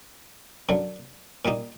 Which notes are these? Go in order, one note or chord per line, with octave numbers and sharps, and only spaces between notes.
F#2 D3 F#3
A#2 G3 A#3 D#4